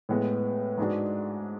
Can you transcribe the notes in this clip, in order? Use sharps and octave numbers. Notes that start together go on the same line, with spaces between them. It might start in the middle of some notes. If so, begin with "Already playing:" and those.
A2 G#3 B3
G#2 G#3 D4 F#4